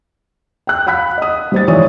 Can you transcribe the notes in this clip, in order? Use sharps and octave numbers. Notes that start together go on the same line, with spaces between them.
G5 F#6
F5 F#5 B5 F#6 B6
D#5 D#6
G3 C5 A6
G#2 E3 F3 C#5 D5 D#6